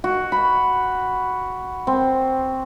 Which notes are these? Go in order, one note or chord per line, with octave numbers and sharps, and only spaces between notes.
F#4
B5
C4